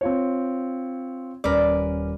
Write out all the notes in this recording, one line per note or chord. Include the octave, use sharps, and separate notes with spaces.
C4 F4 C#5
D#1 C#4 A#4 B4 D5